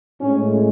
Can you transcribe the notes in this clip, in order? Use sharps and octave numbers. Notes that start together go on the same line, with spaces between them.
A2 G#3 C#4